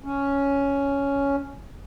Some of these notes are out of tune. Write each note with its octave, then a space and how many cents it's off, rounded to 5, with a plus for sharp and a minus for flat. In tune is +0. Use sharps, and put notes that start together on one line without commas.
C#4 +5